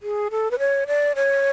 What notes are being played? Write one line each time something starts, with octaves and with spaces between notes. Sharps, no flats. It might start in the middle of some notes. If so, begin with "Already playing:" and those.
G#4
A4
B4
C#5
D5
C#5